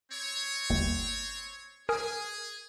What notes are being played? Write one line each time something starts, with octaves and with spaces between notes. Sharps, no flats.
C4 C#5
G1 D#2
G#4 A#4 G#5 D#6